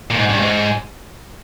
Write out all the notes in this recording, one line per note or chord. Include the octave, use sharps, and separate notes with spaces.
A#2
G#2
G2
G#2